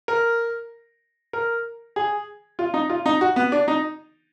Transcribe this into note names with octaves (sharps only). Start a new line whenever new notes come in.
A#4
A#4
G#4
F4
D#4
F4
D#4
F#4
B3
D4
D#4